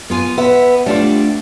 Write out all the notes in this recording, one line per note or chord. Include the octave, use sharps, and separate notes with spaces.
B3 F4 G#5
B3 E5
G3 A3 D4 F4